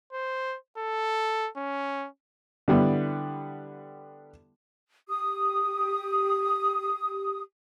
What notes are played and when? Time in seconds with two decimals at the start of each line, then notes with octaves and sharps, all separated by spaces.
0.13 C5
0.78 A4
1.57 C#4
2.68 D3 G3 B3 E4
5.08 G4 D#6